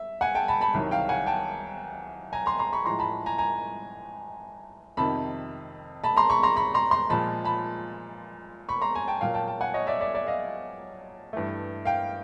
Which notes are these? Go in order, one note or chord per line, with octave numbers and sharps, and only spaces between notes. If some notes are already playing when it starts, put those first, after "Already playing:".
Already playing: E5
F#5 G#5
G5 A5
A5 B5
A5 B5
C2 C3 D#3 F#3
F5 G5
F#5 G#5
G5 A5
G#5 A#5
A#5 C6
A#5 C6
B5 C#6
A2 F3 G#3 A#5 C6
A5 B5
G#5 A#5
G#5 A#5
F2 C3 D#3 A5 B5
A5 B5
A#5 C6
B5 C#6
A#5 C6
B5 C#6
A#5 C6
A#5 C6
A#2 F3 G#3 A5 B5
A5 B5
B5 C#6
A#5 C6
G#5 A#5
G5 A5
A#2 F#3 A#3 F5 G5
G5 A5
G5 A5
F#5 G#5
C#5 D#5
D5 E5
D5 E5
D5 E5
D#5 F5
G2 E3 A3
F5 G5